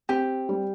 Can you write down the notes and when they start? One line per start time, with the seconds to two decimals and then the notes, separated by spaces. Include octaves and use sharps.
0.09 C4 G4
0.49 G3